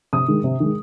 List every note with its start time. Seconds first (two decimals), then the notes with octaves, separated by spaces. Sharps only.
0.13 C3 D#6
0.28 D#3 G#3
0.44 C3
0.60 D#3 G#3